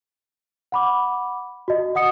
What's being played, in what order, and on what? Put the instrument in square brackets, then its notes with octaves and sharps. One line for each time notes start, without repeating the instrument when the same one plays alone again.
[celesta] F#5 B5 D6
F#4 D#5
D#5 F#5 D#6 C#7